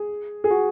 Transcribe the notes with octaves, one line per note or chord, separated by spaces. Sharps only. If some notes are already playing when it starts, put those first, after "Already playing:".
Already playing: G#4
G#4
F#4